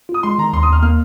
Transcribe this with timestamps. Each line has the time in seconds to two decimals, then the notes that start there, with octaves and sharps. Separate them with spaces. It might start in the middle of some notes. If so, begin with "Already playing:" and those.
0.09 F4
0.14 D#6
0.23 G#3 C6
0.38 D#3 A#5
0.53 D#2 C6
0.63 D#6
0.68 D#2 F6
0.83 A#3 F6